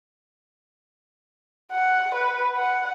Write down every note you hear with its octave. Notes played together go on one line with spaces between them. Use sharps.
F#5
B4
F#5